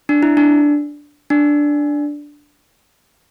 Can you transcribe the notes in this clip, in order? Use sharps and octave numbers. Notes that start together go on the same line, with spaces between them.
D4
E4
D4
D4